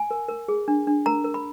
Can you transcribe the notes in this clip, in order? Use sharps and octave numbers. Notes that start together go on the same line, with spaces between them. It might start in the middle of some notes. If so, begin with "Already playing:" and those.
Already playing: G#5
A#4
A#4
G#4
D4
D4
A#4 A#5
A#4
B5